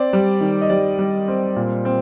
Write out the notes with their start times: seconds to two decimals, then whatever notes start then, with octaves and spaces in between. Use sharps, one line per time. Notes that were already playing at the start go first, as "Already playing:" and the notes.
Already playing: C4 D5
0.13 G3
0.41 D#3
0.61 D#5
0.69 G3 D5
0.99 G3
1.28 C4
1.56 A#2
1.85 C4